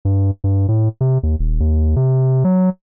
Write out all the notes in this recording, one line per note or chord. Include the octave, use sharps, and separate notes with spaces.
G2
G2
A2
C3
D#2
D#1
D#2
C3
F#3